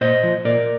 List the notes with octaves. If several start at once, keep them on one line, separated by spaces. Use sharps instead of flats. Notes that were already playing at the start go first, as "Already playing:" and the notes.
A#2 C5 D#5
F3
A#2 A#4 D5